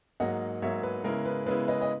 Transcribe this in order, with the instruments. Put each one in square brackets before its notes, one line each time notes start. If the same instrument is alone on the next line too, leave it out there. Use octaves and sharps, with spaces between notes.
[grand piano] G#2 F#3 A#3 D#5 F#5
G#2 F#3 A#3 C#5 E5
B4
C#3 G#3 B3 E4 A#4
B4
C#3 G#3 B3 E4 B4
B4 D#5
D#5